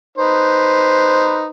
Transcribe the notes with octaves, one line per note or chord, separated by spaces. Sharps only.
D#4 B4 C5